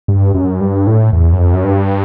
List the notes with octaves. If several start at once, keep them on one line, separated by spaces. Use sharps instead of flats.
G2
F#2
G2
A2
E2
F#2
F2
F#2
G2